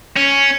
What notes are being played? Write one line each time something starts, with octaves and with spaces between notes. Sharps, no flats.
C#4